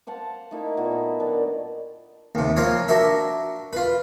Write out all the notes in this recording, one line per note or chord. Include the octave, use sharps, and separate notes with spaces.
C5 F5 F#5 A5
A3 A#3 D#4 E4
A#2 B3 F#4
D#3 F#3 D4 D5
D#2 C3
F3 A#3 C4 F4 C#5
D4 F#4 A#4 E5
F4 B4